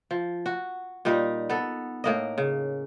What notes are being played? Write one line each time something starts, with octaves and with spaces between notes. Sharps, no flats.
F3
F#4
A#2 G3 D#4 D#5
B3 A4
A2 A#3 D#5
C#3